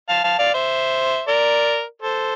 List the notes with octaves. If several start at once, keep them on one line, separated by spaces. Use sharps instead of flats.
F5 A5
F5 A5
D5 F5
C5 E5
A#4 D5
A4 C5